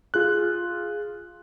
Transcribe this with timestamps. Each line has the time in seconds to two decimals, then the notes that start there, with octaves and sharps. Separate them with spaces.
0.14 F4 G#4 F#6